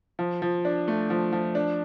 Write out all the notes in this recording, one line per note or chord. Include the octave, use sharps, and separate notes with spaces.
F3
F3
D4
A3
F3
F3
D4